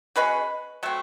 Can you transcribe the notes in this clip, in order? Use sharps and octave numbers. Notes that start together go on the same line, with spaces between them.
B2 G#3 C#4 B4
F#3 A3 C4